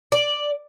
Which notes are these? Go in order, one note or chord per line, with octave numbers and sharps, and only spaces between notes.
D5